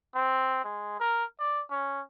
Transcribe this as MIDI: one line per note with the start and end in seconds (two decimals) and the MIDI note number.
0.15 0.61 60
0.64 0.98 56
1.00 1.24 70
1.39 1.62 74
1.70 2.01 61